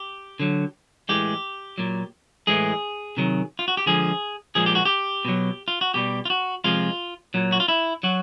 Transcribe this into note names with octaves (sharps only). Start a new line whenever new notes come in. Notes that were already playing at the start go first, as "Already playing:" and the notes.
Already playing: G4
D3 F#3
A2 E3 G#3 G4
A#2 F#3
A2 E3 G#3 G#4
C3 D#3 F#3
F4
F#4
G4
D3 F3 G#3 G#4
A#2 F3 G#3 G#4
G4
F#4
G4
B2 F#3
F4
F#4
B2 G3 G4
F4
F#4
C3 F3 G#3 F4
A#2 F#3
F#4
F4
E4
F#3 F#4